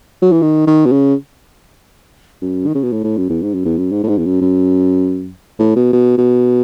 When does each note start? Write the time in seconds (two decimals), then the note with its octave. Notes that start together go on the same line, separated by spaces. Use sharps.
0.22 F#3
0.32 E3
0.42 D#3
0.67 D#3
0.86 B2
0.92 C#3
2.42 F#2
2.67 D#3
2.75 C#3
2.84 B2
2.92 A2
3.04 A2
3.17 F#2
3.29 E2
3.43 G#2
3.54 F#2
3.65 E2
3.78 F#2
3.92 G#2
4.04 A2
4.08 G#2
4.18 E2
4.25 F#2
4.41 F#2
5.59 A2
5.76 B2
5.93 B2
6.18 B2